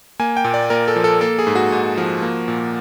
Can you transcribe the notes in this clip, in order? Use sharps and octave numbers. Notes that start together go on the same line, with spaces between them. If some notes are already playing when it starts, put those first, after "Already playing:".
A#3 G#5
G5
A#2
D5
A#2 A#4
A4
F3
A4
A#3 A4
G#4
G#2
F#4
G#2
F3
A#3
A#2